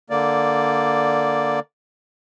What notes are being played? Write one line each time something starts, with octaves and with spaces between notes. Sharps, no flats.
D3 A#3 D5